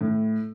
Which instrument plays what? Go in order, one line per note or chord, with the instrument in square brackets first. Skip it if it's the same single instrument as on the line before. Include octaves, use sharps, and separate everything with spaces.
[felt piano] A2